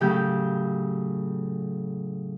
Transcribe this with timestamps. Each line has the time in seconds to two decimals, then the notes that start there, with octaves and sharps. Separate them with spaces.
0.01 A2 C#3 F#3 G4 G6